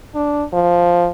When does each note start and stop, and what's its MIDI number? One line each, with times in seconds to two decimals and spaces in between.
0.15 0.44 62
0.53 1.10 53